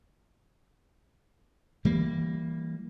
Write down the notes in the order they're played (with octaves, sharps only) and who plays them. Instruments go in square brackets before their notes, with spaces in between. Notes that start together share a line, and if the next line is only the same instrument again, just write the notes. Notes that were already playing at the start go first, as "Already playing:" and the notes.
[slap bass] E3 G3 A#3